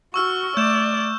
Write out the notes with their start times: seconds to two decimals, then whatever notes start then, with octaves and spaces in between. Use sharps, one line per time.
0.14 F#4 C#6 E6 F6
0.57 A3 D5 G6 E7